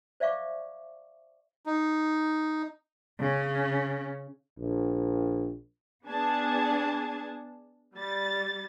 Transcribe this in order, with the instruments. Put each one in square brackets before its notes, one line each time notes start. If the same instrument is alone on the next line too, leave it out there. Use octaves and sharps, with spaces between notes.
[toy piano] C5 D5 E5 F5 C#6 D6
[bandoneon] D#4
[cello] C#3 C#4
[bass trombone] A#1
[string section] B3 D4 G#4 A5 G#6
G3 A6